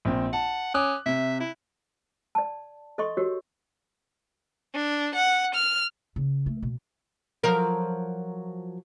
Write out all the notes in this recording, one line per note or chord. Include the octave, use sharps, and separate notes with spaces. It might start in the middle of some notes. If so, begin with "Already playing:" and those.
A#1 C4
F#5 A5
C#4 D6 D#6 F#6
C3 E5
E4
D5 A5
A4 D#5 C6 C#6
F#4 G4 A#4 C#5
D4
F#5
F6
C#3
A3
B2
F3 F#3 A#4